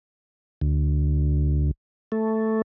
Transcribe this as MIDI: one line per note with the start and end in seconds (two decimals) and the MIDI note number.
0.61 1.71 38
2.12 2.62 57